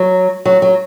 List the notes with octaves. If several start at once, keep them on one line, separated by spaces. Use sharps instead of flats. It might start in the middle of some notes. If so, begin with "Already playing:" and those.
Already playing: F#3
F#3
F#3